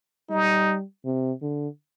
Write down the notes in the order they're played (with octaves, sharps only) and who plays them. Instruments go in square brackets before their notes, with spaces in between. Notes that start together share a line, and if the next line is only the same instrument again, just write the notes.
[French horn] G3 [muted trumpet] D#4
[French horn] C3
D3